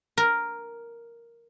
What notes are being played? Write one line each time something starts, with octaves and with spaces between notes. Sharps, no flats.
A#4